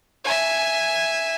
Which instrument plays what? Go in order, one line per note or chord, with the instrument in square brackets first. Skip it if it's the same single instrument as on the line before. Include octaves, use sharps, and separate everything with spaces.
[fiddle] E5 G#5